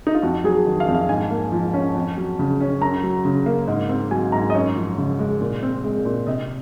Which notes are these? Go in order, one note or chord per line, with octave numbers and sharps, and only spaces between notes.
D#4
F4
F2 F#4
F#3 G#4
D#3
F5
F2
F5
G#2 G#5
A#3
F3
C#4
F2
F#3
C#3
C#4
F#2 A#5
F#3
C#3
A#3
G#2
C4
F#3 G#5
G#2 A#5
D#5
F#2 C#5
F3
C#3
G#3
A#2
C4
G#3
A#2
C3 D#5